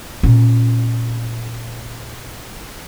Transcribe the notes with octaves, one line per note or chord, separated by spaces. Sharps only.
A#2 C#4